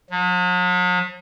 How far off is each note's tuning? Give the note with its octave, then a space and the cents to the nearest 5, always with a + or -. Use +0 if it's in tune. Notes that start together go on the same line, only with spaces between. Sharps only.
F#3 -45